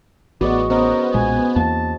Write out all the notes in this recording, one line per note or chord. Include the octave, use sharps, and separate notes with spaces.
A1 B3 F#4 G#4 D5 D#5
B3 C#4 A#4 C5 D#5
B1 A#2 G#3 G#5
E2 A#3 A5